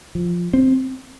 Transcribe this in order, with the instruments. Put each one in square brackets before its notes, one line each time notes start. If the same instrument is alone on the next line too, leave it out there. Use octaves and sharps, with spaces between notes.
[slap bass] F3
C4